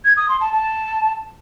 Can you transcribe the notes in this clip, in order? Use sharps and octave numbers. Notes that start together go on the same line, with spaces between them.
G#6
D#6
C6
A5
A5